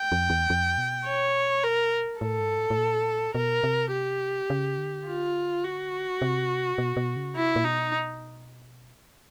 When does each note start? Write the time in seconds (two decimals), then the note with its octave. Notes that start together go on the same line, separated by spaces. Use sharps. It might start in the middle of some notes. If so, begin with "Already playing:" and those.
Already playing: G5
0.12 F2
0.30 E2
0.50 F2
0.78 B2
1.06 C#5
1.64 A#4
2.20 A2 A4
2.40 G#2
2.59 A2
2.70 A2
2.78 A#2
3.35 B2 A#4
3.64 C3
3.92 G4
4.50 C#3
4.78 D3
5.06 F4
5.64 F#4
6.22 C3
6.78 B2
6.97 B2
7.16 C#3
7.35 C3 E4
7.56 A#2
7.64 B2 D#4